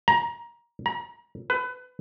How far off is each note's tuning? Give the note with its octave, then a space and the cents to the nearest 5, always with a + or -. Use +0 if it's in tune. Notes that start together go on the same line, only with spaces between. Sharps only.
A#5 +20
A#5 +40
B4 +25